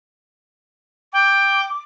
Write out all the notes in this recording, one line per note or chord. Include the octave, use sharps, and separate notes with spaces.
G5 D6